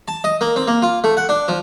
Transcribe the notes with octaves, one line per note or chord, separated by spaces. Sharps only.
A5
D#5
A#3
C4
A#3
F4
A3
F#5
D4
F3